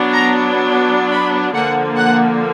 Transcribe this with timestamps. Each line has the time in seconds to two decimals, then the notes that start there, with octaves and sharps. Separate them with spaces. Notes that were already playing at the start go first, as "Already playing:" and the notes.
Already playing: F#3 B3 D4
0.14 A#5
0.70 B5
1.12 B5
1.54 D3 F3 A#3 F#5
1.96 F#5